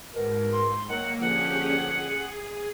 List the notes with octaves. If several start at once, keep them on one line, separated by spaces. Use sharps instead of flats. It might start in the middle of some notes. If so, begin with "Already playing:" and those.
G#2 B2 A#4
C6
D#3 F#3 A#3 F#5
A#2 D3 F3 C#4 G4 G#4 F#5
G#4